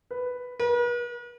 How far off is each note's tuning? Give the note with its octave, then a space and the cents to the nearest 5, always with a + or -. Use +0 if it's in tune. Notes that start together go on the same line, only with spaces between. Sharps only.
B4 +5
B4 -45